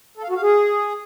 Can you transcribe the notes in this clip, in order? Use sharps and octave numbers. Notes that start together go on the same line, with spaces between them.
A4
F5
F#4
F5
G#4